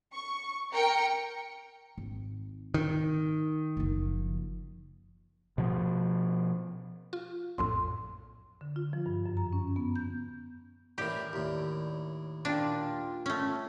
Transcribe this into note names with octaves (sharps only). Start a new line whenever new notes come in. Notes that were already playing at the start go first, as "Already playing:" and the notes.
C#6
A#4 G5 C#7
G#1
D#3
F#1 F3
B2 F3
F4
A#1 F2 A2 C6
D3
F4
F3
G2
F#2
A#5
C#4
B3
G6
A2 E3 D4 G4 A#4
D#2 A2
A#2 D4 F4 G5
A3 C#4